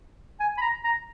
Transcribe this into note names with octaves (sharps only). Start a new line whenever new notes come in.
G#5
B5
A#5
A#5